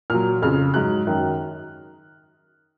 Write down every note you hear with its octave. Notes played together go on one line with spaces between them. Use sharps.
A#2 F#3 F6
F2 C#3 F3 F6
G#2 F#3 F#6
F#2 D#3 F#3